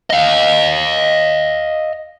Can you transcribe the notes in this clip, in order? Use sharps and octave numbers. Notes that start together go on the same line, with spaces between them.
D#5 F5